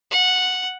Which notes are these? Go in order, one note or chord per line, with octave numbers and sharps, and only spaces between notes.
F#5